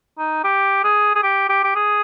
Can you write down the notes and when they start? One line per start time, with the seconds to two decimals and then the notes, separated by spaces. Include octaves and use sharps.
0.18 D#4
0.44 G4
0.84 G#4
1.15 G#4
1.23 G4
1.49 G4
1.64 G4
1.75 G#4